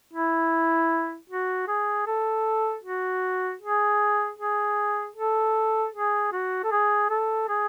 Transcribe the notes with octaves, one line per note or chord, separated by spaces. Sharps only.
E4
F#4
G#4
A4
F#4
G#4
G#4
A4
G#4
F#4
A4
G#4
A4
G#4